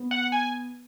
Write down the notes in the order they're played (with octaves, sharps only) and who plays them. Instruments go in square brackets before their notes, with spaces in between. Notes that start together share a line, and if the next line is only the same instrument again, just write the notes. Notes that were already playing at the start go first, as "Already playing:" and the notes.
Already playing: [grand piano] B3
[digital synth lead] F#5
G#5